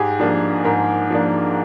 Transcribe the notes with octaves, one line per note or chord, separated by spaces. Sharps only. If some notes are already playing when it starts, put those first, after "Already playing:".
Already playing: G#2 G4 G#4
F3 A#3 D4
G#2 A#4
F3 A#3 D4